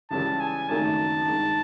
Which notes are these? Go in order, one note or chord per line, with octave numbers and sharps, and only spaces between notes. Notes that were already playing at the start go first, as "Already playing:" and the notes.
C#2 C#3 E3 G3 A5
G#5
G#1 F#2 D#3 F#3 A3 A5
G2 D#3 G#3